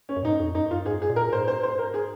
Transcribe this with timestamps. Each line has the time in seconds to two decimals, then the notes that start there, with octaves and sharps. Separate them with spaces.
0.09 C#4
0.16 F#2
0.23 A#2 D#4
0.28 G#2
0.40 F2
0.55 F#2 D#4
0.71 F#2 F4
0.86 G#2 G#4
1.02 G#4
1.10 A#2
1.16 A#4
1.33 G#2 C5
1.48 C5
1.63 C5
1.79 A#4
1.94 G#4